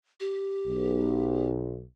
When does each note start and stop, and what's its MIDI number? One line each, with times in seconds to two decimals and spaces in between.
0.20 1.48 67
0.67 1.83 35